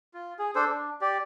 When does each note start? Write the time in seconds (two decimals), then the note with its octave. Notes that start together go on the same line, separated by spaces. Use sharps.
0.14 F4
0.39 G#4
0.55 D4 A4 C5
0.70 D4
1.01 G4 D5